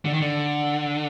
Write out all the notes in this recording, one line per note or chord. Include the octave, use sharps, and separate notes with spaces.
D3
D#3
D3